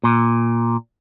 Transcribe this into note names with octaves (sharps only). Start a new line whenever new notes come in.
A#2